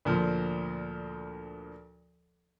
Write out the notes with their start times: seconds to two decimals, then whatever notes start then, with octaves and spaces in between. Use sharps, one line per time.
0.05 D2 A#2 F3